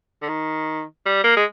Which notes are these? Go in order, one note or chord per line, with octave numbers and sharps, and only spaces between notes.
D3
D#3
G3
A#3
G#3